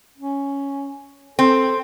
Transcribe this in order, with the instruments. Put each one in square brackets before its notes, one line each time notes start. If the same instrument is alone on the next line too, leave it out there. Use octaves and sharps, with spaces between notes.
[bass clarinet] C#4
[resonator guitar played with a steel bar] C4 [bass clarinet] A4